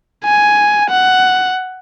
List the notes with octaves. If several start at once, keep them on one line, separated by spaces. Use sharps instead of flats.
G#5
F#5